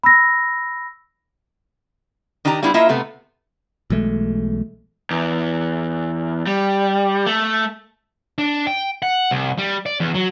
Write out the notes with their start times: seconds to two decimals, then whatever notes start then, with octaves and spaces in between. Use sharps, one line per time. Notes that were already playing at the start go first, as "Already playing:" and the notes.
0.04 B5 E6 A#6
2.45 D#3 D4 D#4 G4 A#5
2.63 G3 B3 D4 E4 F4
2.74 A#3 E4 F4 D#5 E5
2.89 C3 A3 B3
3.90 B1 E3 G#3 A3
5.11 E2
6.47 G3
7.27 A3
8.38 D4
8.67 G5
9.02 F#5
9.31 C2
9.58 G3
9.86 D5
10.00 E2
10.15 F#3